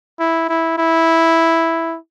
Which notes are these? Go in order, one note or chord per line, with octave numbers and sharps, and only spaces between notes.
E4
E4
E4